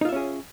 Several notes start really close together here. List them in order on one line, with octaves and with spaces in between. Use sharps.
D#4 F4 E5 C#4 G#4